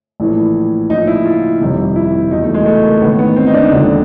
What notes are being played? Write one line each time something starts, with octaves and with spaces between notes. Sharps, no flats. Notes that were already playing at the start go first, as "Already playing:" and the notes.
A#1 A2 E3
A#1 A2 F3 D#4
E4
F4
G1 F2 C3 D#3
E4
E2 B2 D#4
A3
G#3
A3
A#3
A1 G#2 D#3 B3
B3
C4
D#4
D4
E1 D#2 D3 F3